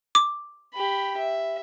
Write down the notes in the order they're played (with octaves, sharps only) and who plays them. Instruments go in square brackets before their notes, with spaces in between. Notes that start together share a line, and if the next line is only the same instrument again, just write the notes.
[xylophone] D6
[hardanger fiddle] G4 B5
E5